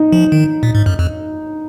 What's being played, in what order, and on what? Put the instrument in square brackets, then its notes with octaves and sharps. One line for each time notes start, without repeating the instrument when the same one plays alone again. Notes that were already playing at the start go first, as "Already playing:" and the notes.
Already playing: [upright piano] D#4
[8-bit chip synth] F3
D#3
A#2
G#2
F#2
F2